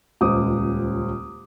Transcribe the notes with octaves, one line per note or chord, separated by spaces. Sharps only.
D#1 C#2 C5 D6 D#6